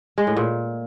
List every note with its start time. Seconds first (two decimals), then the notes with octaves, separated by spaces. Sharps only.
0.18 G#3
0.27 A2
0.37 A#2